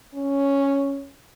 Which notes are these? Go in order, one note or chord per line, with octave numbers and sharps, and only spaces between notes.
C#4